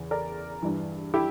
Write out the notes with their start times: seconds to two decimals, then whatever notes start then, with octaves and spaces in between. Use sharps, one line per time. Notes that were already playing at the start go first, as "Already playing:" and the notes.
Already playing: E2 C#3 E3
0.11 A#4 D5
0.62 G2 E3
1.14 E4 G4